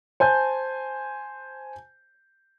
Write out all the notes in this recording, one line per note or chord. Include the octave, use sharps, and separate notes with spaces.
C5 G#5 A5 G6